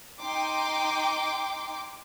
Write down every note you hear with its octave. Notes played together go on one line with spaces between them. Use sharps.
D#4 G5 C6 D6